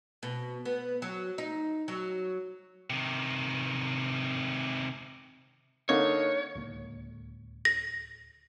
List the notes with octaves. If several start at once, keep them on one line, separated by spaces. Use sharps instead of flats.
B2
B3
F#3
D#4
F#3
C3 D#3
D3 A#3 D#4 C#5
D1 C#2 A#3
A#6